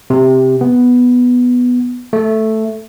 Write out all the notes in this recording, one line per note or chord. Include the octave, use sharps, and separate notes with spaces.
C3
B3
A3